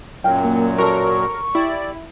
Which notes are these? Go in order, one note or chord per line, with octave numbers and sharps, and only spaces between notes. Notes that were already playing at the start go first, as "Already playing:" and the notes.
F#2 A#2 F#3 A#4 F5 G5
A#3
F#4 A4 A#4 C#5 C#6
E4 G4 D5